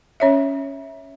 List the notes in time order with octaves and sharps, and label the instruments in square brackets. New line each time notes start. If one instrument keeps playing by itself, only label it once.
[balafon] C#4 C#5 E5